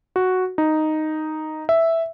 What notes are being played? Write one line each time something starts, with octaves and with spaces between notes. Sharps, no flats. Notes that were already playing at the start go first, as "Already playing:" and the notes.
F#4
D#4
E5